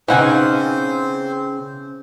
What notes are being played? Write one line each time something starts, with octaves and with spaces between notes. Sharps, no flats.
C#3 E3 C4 C#4 D#4 C5 F#5 G#5